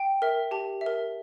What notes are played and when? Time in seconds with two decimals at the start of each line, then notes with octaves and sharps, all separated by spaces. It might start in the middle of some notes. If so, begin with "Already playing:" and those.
Already playing: G5
0.22 A#4 E5
0.51 G4 A5
0.81 E5
0.86 A#4